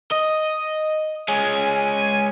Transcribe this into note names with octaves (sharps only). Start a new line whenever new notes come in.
D#5
G#3 C#4 G#5